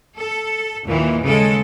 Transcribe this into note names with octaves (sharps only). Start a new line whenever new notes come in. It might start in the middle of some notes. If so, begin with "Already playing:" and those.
A4
D#2 A#2 D#3 E3
C#3 G#3 A4